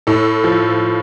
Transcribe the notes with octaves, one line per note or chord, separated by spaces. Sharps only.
A2 A4
F3